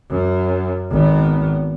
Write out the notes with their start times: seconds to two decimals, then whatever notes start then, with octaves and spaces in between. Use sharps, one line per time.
0.10 F#2
0.90 G#1 B3